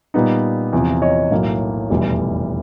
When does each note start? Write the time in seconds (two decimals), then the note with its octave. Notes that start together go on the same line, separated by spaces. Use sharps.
0.14 A#2 G3 B3 D#4
0.73 E2 C3 F3
1.02 C#5 D#5
1.31 B1 A2 F#3 A#3
1.90 F1 E2 B2 G3